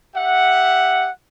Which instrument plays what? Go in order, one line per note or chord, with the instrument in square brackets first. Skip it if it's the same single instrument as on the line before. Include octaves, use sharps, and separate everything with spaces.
[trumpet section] G4 E5 F#5